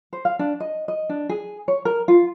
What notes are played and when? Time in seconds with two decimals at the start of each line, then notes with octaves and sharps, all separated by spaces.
0.13 C5
0.25 F5
0.39 D4
0.60 D#5
0.88 D#5
1.09 D4
1.29 G#4
1.68 C#5
1.85 A#4
2.08 F4